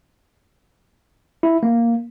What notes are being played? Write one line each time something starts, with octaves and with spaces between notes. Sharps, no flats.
E4
A#3